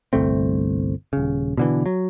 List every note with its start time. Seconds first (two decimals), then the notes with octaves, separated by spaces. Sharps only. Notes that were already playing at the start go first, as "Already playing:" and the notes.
0.13 G1 C2 A3 C4
1.13 D#1 C#3
1.58 B2 D3 E3
1.86 F#3